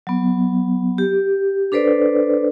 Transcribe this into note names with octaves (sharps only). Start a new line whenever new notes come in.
F#3 B3
G4
D4 A4 B4 C5 D5